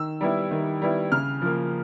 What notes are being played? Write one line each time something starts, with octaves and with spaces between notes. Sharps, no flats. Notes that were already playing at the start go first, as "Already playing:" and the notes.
Already playing: D#3 E6
G3 B3 E4
D#3
G3 B3 E4
C#3 F6
F3 A#3